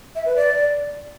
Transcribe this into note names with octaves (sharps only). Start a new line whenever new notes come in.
E5
B4
D5